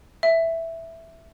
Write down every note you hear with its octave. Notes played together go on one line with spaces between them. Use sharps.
E5